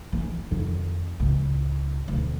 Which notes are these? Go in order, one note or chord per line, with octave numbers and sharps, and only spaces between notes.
E3 C#4
F2 D#3
C#2 A2
D2 B2